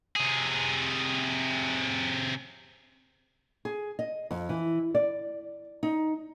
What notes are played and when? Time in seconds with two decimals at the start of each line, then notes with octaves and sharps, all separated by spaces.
0.16 C3 G#4
3.65 G#4
3.99 D#5
4.31 F2
4.49 E3
4.95 D5
5.83 D#4